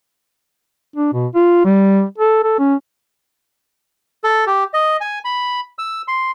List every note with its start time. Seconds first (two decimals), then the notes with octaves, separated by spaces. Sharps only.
0.96 D4
1.13 B2
1.35 F4
1.65 G3
2.18 A4
2.44 A4
2.59 C#4
4.24 A4
4.47 G4
4.74 D#5
5.01 G#5
5.25 B5
5.79 E6
6.08 C6